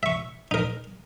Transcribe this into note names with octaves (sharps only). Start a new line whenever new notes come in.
E5 C#6
D#4 A#4